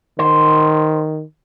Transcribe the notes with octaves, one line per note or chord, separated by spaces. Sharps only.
D#3 C5